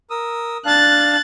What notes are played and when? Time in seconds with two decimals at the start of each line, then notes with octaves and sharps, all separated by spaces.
0.10 A#4 D#6 E6
0.65 D4 F5 A5 F#6 A6